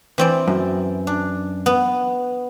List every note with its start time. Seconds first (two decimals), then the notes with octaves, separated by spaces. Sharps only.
0.18 E3 C4 D5
0.48 F#2
1.07 D4
1.66 B3